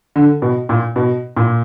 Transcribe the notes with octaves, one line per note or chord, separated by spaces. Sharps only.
D3
B2
A#2
B2
A#2